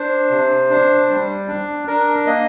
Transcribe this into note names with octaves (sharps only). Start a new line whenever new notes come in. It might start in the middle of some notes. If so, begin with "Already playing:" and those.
Already playing: D4 C5
C3
D4
G3
D4
D4 A#4
A#3 D#5